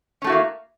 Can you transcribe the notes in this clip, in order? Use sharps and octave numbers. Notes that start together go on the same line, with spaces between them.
A3 A#3 C#4 E4 F#4